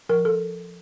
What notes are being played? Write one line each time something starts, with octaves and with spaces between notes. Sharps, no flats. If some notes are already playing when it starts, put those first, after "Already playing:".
F3 A#4
A4